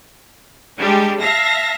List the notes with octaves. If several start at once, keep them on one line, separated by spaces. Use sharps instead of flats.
G3 G#3 D4 G4
E5 F5 A5 A#6